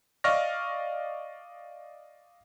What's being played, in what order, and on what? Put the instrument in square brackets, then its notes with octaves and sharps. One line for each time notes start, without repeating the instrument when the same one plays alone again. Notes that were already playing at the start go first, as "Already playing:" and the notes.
[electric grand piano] D5 D#5 F5 C#6 F6 A#6